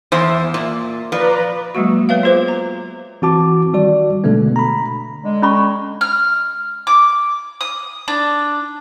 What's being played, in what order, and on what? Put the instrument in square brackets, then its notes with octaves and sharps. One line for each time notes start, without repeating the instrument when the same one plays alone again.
[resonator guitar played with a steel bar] E2 C5 E5
A#2
[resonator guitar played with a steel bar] F3 [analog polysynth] B4 D5 A#5
[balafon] F#3 G#3 A#3 F#4
B3 B4 C#5 E5 F5
F4 G#4 C5 D6
A#5
[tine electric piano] E3 C4 F#4 A5 D6
D#3 G3 F#4 D5
B2 D3 G#3 A3 B3
A#5 B5
[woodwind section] D3 G#3
[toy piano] C#4 B5 C#6
[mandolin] F6
D6
D#6
D4